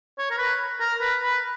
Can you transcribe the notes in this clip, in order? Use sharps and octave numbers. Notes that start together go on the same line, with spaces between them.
C#5
A#4
B4
A#4
B4
B4